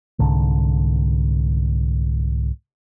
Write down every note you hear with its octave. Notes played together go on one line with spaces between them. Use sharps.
C2 G#2 D3